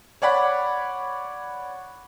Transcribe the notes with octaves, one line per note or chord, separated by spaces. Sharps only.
C#5 D5 F#5 B5